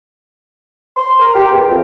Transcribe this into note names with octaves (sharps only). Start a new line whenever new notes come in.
C6
A#4
G4
E2
F2